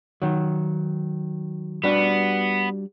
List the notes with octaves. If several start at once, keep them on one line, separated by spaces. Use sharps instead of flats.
D#3 F#3
G3 B3 D4 F#4